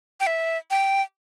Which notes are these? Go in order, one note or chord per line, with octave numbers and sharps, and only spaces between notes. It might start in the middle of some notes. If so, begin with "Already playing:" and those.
G5
E5
G5